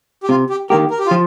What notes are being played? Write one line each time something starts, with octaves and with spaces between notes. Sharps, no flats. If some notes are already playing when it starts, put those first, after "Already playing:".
G4
C3 F4
G4
D#3 A#3 G4 A#4
A#4
G4
F4
F3